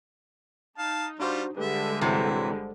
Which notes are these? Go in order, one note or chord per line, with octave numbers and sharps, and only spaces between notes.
D#4 F5 A5
G3 D4 F4 F#4 C5
D3 G3 G#3 G4 B4 E5
G1 C3 E3 F#3 E4 C5